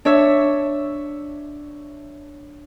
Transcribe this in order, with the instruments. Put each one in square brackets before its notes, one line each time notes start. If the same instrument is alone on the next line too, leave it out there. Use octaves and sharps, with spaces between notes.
[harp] D4 C#5 E5